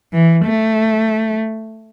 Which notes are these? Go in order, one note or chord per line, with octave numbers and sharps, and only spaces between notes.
E3
A3